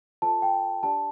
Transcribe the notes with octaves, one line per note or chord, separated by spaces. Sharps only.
F4 A4 C5 A5
G5
D4 G4 D5 A5